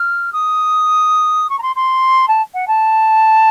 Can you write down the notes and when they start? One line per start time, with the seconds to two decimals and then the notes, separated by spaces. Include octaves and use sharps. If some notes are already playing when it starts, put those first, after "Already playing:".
Already playing: F6
0.32 D#6
1.49 C#6
1.58 A#5
1.62 C6
1.76 C6
2.28 A5
2.54 F#5
2.67 A5